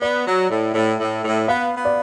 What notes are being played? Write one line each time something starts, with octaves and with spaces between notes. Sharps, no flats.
B3 D5
F#3
A2
A2
A2
A2
B3 F5
B3
D5